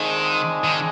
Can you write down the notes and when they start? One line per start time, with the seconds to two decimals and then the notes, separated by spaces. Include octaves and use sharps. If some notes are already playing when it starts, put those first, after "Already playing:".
Already playing: D3 D#3 F3 G#3 C4
0.64 D#3